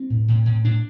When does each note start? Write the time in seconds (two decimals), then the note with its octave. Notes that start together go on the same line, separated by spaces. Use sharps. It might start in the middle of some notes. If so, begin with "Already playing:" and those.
Already playing: C4
0.10 A2
0.28 A2
0.46 A2
0.64 A2 D4